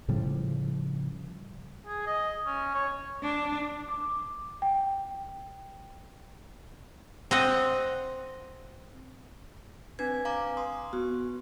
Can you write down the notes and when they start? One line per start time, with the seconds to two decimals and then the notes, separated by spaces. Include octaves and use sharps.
0.08 A2 C#3 F3 G3
1.87 G#4
2.07 D#5
2.46 C#4
2.75 C#5
3.22 D4
3.89 D6
4.62 G5
7.31 C4 D#5 F#5
9.99 C4 D4 B4 G#5 G#6
10.25 F5 A#5 D6
10.57 C6 D#6
10.93 B3 F#4